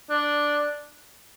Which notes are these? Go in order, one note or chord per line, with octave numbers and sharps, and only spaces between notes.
D4